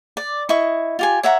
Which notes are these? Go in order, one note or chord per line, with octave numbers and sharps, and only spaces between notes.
D5
E4 D#5 C#6
F4 G4 G#5
C#5 E5 F#5 A#5